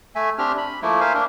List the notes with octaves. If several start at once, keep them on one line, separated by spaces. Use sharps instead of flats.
A3 E5 G#5
C4 D4 G4 F6
B5
F3 A3 A#3 E4
A#4 C5 E5 F5 G#5
A#3 D4 A#4